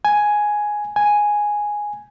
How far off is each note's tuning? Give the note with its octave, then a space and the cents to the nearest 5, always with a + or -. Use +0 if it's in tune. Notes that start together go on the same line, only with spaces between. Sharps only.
G#5 +5
G#5 +0